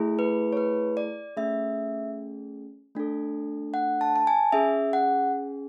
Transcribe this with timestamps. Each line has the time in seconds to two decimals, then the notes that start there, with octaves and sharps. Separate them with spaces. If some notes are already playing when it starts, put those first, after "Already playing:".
Already playing: A3 E4 G#4
0.19 B4
0.53 C#5
0.57 B4
0.97 D5
1.37 A3 C#4 G#4 E5
2.95 A3 D4 A4
3.74 F#5
4.01 A5
4.16 A5
4.27 G#5
4.52 C#4 G#4 E5
4.93 F#5